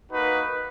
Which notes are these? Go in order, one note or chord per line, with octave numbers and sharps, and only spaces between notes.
A#3 D#4 F#4 B4